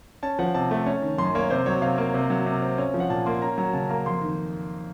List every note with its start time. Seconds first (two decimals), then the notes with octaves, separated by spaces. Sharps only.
0.23 C#4 A5
0.39 F3 F#5
0.54 C3 A5
0.71 A3
0.86 C#4
1.02 D#3
1.18 F#2 C6
1.35 A#3 C#5
1.50 C3 C5
1.66 F#3 C#5
1.82 C3 F5
1.98 A#3
2.14 C3
2.30 F#3
2.46 C3
2.62 C4
2.78 C#4
2.94 F3
3.00 F#5
3.09 A#2 A5
3.26 A#3 C6
3.42 C#4 A#5
3.58 F#3 A#5
3.73 C#3 A5
3.89 A#3 A#5
4.06 F2 C6
4.22 D#3